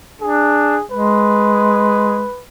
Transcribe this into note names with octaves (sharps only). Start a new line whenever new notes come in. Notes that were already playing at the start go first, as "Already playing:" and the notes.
D4 G#4
G#3 B4